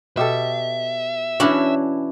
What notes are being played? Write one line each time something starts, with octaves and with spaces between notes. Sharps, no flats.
B2 G4 A4 E5
E3 C#4 D4 E4 F#4